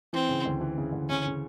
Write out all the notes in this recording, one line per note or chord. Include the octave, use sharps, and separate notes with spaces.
E3 C4
C#3
D2
E3
C#3
D2
C#3 C#4
C#3